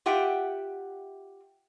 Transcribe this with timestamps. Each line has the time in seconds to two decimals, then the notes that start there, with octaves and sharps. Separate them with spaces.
0.06 F4 G4 E5 F#5 G5